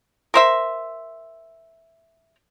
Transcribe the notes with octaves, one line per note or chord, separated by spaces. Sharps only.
A#4 C5 E5